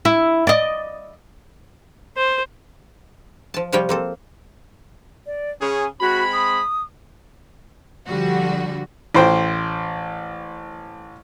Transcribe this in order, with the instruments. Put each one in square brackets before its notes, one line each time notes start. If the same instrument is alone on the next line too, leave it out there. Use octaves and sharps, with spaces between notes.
[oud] E4
D5 D#5
[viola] C5
[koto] F3 A5
C3 F3 G3 F4 C#5 G5
A#3 C4 A4
[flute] D5
[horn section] C#3 C#4 G#4 [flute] G#5
[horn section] G#3 C4 B5 [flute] F#4
[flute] D#6
[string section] D3 F3 G3 F#4
[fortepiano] A1 C5 G5